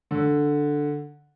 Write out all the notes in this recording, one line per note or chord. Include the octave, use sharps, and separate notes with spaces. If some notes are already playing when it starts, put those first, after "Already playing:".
D3